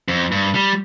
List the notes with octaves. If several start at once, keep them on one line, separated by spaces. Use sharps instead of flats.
F2
G2
G3